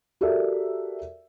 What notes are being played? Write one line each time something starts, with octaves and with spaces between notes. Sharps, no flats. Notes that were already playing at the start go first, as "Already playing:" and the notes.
F#4 G4 A4 A#4 D5 E5